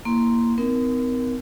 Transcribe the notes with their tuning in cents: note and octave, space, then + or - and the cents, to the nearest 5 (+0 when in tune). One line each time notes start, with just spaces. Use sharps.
A#3 +0 E4 +0 C6 +0
C4 -40 D#4 +15 A#4 +15